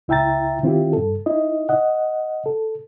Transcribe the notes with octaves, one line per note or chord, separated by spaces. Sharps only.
C#2 E4 E5 G5 A#5 A6
D#3 C4 E4 F4 G4
G2 A4
D#4 E4 D#5
D#5 F#5
A4